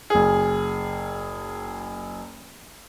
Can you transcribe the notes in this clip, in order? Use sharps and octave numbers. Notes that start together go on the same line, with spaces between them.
F#1 G#4